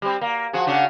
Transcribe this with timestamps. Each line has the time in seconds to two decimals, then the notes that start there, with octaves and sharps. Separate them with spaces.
0.02 G3 C4
0.21 A#3
0.53 F3 F#4 G#4
0.67 C#3 D4 F#4